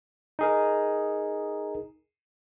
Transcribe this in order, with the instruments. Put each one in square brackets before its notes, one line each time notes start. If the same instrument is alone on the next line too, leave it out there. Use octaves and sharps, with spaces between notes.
[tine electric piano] D#4 G#4 A#4